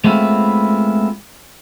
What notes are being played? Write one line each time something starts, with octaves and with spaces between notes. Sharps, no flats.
G#3 A3 B3 C4 E4 F4